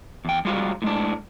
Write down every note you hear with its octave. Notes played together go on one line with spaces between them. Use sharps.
E2 G5
G3 G#3 F4 F#4
A2 G#3 D4